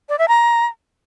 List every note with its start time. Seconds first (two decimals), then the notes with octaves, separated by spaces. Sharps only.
0.09 D5
0.19 E5
0.28 A#5